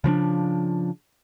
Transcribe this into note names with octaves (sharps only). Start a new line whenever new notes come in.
C#3 F3 C4 D4